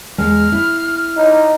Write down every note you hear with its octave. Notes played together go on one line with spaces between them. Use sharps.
E2 G#3 G#5 F6
E4
D#4